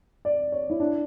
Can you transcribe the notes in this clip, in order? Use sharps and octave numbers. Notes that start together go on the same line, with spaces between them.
D5
C#5
E4
D4